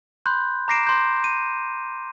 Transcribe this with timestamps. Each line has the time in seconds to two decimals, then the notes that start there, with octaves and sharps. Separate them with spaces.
0.26 B5 C6 F#6 G6
0.68 A#5 D6 A#6 C7 D7 E7
0.87 C6 G6
1.24 D#7